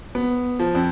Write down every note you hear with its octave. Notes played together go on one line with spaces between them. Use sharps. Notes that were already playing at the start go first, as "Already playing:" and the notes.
B3
F3
F2